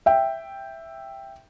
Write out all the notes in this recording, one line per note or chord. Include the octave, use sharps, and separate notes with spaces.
E5 G5